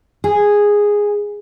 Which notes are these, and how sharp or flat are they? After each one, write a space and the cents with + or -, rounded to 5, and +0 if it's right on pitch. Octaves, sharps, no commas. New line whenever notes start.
G#4 -5